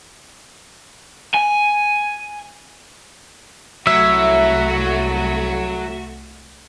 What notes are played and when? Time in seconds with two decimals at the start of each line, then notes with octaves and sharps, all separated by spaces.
1.34 G#5
3.87 C2 F#3 A3 E4 F#4 E5